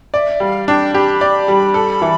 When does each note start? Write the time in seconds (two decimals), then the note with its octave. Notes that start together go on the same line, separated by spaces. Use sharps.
0.14 D5 E5
0.40 G3 F5
0.68 D4 G5
0.94 G4 B5
1.21 D5
1.48 G3
1.74 A4
2.02 E3